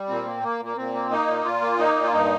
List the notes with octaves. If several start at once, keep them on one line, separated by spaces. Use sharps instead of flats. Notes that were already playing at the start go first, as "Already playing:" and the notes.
Already playing: G3
A#2 C4
A#3
A#3
A#2 A#3
A#2 C4
A#3
A#3 D#4
A#2
A#2 F4
A#3
A#3 D#4
A#2
F4
G2 D#4